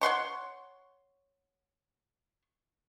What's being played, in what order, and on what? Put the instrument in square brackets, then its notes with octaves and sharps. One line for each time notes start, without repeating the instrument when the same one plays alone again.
[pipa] C#5 F#5 C6 C#6